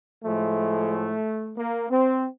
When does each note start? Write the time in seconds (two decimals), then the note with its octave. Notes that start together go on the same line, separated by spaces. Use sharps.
0.23 A2 F3 G#3 A3
1.57 A#3
1.90 C4